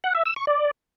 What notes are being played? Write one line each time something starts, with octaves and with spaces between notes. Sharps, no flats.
F#5
E5
E6
C#6
D5